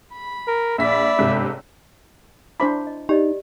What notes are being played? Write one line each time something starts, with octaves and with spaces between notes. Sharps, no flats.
B5
A#4
A#1 D5 E5 B5 B6
G1 G#2 C3
D4 E4 C5 E5 B5 D6
D#5
D#4 G4 D5 D#5